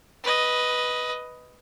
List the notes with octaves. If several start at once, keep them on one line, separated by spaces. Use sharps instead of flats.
B4 D#5